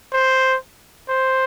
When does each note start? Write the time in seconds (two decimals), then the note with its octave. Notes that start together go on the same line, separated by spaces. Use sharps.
0.13 C5
1.09 C5